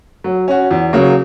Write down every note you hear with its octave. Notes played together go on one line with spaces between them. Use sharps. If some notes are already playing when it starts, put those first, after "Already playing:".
F#3
C#4 F#4
E2
C#3 F#3 A#3